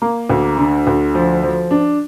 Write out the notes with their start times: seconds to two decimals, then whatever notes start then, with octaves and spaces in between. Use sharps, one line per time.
0.02 A#3
0.30 D2
0.58 D3
0.87 D2
1.15 F3
1.43 F3
1.71 D4